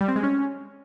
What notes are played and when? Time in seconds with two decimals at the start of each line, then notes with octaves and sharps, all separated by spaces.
0.01 G3
0.08 C4
0.16 G#3
0.23 C#4